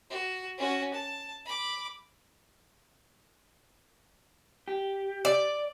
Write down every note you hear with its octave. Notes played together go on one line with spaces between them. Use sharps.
F#4
C#4 F#4
A5
B5 D6
G4
D5